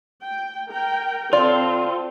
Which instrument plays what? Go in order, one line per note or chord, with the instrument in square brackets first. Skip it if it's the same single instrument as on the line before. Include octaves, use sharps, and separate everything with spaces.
[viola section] G5
A#4 G5
[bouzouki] D3 E4 [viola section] C4 A4 [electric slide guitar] F4 [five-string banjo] D5